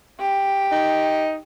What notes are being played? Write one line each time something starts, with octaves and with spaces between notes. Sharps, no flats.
G4
D#4